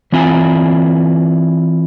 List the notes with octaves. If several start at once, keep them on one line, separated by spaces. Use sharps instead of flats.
E3 C4 E4 F4 G5 G#5